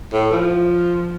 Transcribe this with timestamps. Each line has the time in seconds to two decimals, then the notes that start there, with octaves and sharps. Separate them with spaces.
0.13 A2
0.31 F3